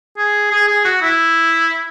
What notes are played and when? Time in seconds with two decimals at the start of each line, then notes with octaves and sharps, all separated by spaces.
0.18 G#4
0.51 G#4
0.68 G#4
0.85 F#4
1.02 E4